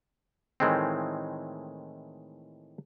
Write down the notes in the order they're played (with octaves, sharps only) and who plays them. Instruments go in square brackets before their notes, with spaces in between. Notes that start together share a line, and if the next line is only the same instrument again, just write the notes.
[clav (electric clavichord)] A2 D#3 E3 G#3 A3 C4